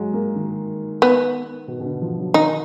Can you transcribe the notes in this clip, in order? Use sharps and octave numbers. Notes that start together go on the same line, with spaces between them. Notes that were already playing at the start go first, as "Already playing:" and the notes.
Already playing: F#3 G#3
A#3
D#3
B3
B2
B2
D3
F3
F#3
D#3 D#4